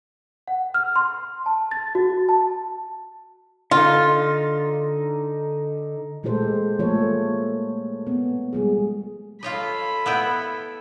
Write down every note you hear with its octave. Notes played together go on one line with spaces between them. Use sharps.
F#5
F6
C6
A5
A6
F#4
F#4
A5
D3 D#4 F4
A#2 G#3 A3 G4 A4 C5
F3 A3 A#3 A4 C#5
B3
G3 G#3 G#4
F4 A4 C#5 D#5 B5
B3 E4 G5